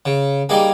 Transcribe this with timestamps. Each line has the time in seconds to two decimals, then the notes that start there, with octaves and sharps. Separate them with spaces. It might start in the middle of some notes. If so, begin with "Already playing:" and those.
0.06 C#3
0.49 G3 A#3 D#4 G#4